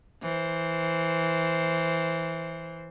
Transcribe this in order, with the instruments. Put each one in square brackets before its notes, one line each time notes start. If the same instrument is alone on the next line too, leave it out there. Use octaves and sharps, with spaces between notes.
[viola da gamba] E3 C5